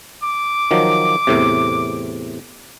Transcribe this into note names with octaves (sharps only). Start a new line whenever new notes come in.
D6
D#3 F3 F#3
E2 A2 C3